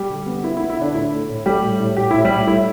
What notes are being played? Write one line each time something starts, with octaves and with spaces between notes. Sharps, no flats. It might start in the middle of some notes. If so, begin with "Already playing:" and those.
Already playing: G3 G4
D3
B3
B3 E4
E4
B3
E4
D3 D4
A2 E4
A3
A2
G3 A3 G4
A2
A2
A2 G4
A2 E4
G3 G4
A2
A2 E4